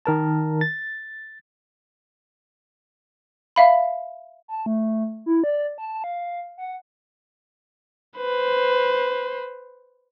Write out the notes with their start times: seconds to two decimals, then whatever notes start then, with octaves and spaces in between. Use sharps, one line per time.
0.06 D#3 A#4 A5
0.61 A6
3.56 E5 F5 B5
4.48 A5
4.66 A3
5.26 E4
5.44 D5
5.78 A5
6.04 F5
6.58 F#5
8.17 B4 C5